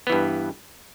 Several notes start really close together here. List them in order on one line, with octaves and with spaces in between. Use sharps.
B3 E3 G2